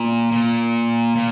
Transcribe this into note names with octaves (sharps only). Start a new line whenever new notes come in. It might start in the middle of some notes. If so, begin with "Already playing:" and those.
Already playing: A#2
A#2
A#2